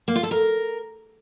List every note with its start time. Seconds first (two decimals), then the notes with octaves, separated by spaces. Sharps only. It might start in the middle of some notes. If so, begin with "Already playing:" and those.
0.08 A#3
0.16 F4
0.23 A4
0.31 A#4